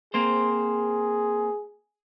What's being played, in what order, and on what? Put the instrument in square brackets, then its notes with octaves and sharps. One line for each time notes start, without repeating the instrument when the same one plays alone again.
[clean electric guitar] A#3 C4 C5 [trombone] G#4